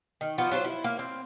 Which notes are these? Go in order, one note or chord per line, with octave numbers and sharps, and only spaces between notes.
D#3
F3 B3 F4 F#4
F#3 F4 A#4 C5
E4
A#3
C4